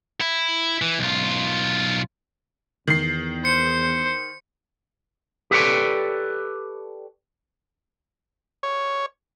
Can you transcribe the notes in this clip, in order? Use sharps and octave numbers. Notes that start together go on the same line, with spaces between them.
E4
E3
B1 F4
E2 D#3 C7
C5 C#7
G4 A4 B4 C#5 D5
C#5